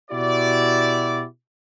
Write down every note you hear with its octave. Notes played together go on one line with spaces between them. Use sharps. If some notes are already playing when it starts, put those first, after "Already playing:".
B2 E4 F#4 G4 D5